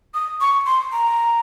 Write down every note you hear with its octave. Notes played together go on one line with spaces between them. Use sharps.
D#6
C#6
C6
A#5